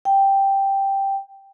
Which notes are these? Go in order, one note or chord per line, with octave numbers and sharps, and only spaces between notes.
G5